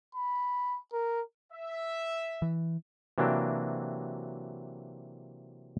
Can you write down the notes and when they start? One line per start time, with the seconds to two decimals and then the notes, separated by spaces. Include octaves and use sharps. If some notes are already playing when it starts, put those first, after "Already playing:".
0.15 B5
0.93 A#4
1.53 E5
2.42 E3
3.18 C3 E3 F#3 A#3 D4